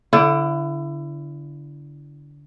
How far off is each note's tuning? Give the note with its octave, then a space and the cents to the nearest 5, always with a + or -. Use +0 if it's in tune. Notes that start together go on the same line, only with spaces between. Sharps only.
D3 -20 E4 +25